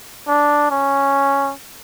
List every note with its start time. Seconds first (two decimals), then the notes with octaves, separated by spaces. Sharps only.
0.28 D4
0.70 C#4